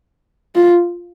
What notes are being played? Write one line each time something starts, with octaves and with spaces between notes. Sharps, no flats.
F4